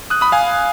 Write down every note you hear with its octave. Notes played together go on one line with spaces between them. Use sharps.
D#6 F#6
B5 D#6
F5 G#5